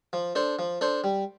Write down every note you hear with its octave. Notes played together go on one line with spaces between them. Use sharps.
F3
D4 A4 C5
F3
D4 A4 C5
G3